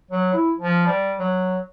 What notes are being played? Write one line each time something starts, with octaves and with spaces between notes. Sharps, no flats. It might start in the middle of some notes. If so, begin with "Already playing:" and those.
F#3
E4
F3
G3
F#3